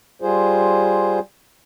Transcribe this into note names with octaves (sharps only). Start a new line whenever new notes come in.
G3 F4 G#4 C5